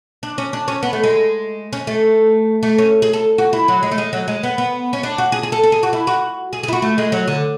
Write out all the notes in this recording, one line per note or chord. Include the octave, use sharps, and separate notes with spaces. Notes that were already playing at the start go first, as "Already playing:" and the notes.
D4
C#4
D4
C#4
B3
A3
G#3
C#4
A3
A3
C#4
G#4
A4
F#4
E4
F#3
G#3
A3
G#3
F#3
G#3
B3
B3
C#4
D4
F#4
G#4
G#4
A4
A4
G#4
F#4
E4
F#4
G#4
G#4
E4
F#4
A3
G#3
F#3
D3